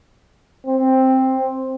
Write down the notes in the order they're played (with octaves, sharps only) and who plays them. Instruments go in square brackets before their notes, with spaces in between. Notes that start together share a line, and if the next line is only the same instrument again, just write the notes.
[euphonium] C4